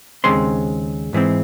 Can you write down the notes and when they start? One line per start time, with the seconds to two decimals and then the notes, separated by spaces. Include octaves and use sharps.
0.24 D#2 C#3 G#3 C4 C6
1.13 G#2 E3 G#3 C4